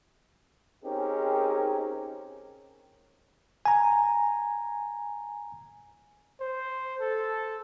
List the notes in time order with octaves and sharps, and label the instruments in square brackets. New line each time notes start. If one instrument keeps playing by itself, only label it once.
[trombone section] C4 C#4 D#4 G4 G#4 A#4
[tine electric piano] G#5 A#5
[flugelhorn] C5
A4